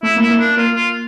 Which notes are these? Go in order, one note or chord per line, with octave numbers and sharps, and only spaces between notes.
A3 E4
A#3
E4
A#3
D4
A#3 F4
F4